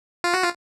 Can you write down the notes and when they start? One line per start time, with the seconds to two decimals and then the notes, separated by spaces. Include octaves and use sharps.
0.24 F4
0.34 F#4
0.44 F4